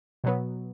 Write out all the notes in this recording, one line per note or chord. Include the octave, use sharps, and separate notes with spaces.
B2 F#3 B3